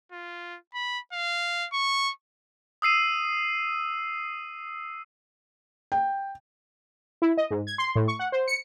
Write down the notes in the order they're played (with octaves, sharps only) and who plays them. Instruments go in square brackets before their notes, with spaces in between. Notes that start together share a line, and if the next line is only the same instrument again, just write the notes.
[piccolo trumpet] F4
B5
F5
C#6
[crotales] D#6 E6 C7 D#7
[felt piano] G5
[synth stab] E4
D#5
G#2
G#6
C6
A2
C#6
F#5
C5
C#7